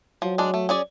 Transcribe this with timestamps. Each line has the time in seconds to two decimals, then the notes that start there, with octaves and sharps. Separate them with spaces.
0.22 F3 F#3
0.38 G#3 D4
0.54 A3
0.69 C#4 G#4 D5